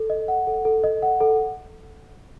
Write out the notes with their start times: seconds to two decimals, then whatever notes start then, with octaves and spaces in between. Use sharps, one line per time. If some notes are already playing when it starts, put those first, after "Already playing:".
Already playing: A4
0.10 D#5
0.28 F#5
0.47 A4
0.65 A4
0.84 D#5
1.02 F#5
1.20 A4